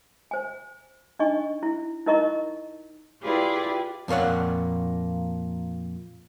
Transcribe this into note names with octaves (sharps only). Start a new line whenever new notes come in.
C5 G#5
D4 D#4 D#5 G#5 C#6
E4
D#4 E4 A#4 D#5 A#5 C#6
E4 F4 G4 G#4 B4 D5
F2 A#2 A#3 C#5 F#5